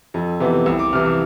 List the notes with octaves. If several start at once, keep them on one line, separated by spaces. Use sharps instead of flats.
F2
C3 E3 B3
C2 E6
D6
C3 E3 F6
E6